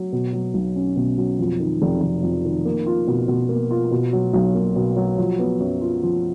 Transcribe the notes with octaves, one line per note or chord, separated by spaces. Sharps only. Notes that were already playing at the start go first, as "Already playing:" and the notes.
Already playing: F#3
B2
F#3
B1
C#4
B2
F#3
F2
D#3
F1
F1
F2
D#3
A#3
F4
B2
B2
A#3
F4
B2
F#3
B1
A#3
B2
F#3
F3
B3
F#2
F4
F3